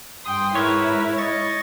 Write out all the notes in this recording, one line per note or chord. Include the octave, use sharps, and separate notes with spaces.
G2 G5 C6 D#6
G#2 E4 A#4 B4 C#5 E6
D#5 C#6 A6